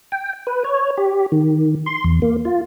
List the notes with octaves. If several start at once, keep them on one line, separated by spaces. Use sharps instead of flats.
G5
B4
C#5
G4
D#3
C6
E2
A#3
F4